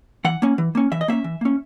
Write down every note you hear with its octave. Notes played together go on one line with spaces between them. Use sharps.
E3 F#5
A#3 C#4
E3
A#3 C#4
E3 E5
D#5
A#3 C#4 E5
E3
A#3 C#4